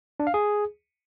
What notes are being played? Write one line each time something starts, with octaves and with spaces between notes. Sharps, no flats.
D4
F5
G#4